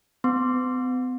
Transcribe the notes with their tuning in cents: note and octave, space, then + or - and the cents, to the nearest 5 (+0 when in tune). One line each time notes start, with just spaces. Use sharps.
B3 +40 C6 +10